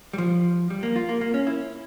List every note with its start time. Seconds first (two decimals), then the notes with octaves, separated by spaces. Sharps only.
0.13 G3
0.18 F3
0.70 G3
0.83 A#3
0.96 F4
1.09 A#3
1.21 A#3
1.34 C#4
1.47 E4